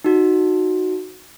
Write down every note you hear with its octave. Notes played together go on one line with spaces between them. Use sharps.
D#4 F#4